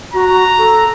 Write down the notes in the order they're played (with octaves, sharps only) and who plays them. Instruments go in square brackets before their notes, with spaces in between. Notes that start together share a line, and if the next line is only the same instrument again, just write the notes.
[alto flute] F#4 [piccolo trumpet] A#5
[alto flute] A4